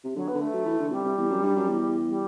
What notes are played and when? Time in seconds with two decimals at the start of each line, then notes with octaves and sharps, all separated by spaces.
0.04 C3
0.15 D3 F#3
0.28 B3
0.34 D3
0.41 A3
0.53 F#3
0.66 E3
0.79 D3
0.92 C3 G3
1.04 C3
1.17 E2
1.30 F#2
1.42 G2
1.56 F#2
1.68 E2
2.07 G3